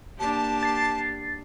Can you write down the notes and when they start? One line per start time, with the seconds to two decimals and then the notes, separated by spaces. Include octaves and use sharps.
0.19 A#3 D4 G4 A5
0.63 A6 C7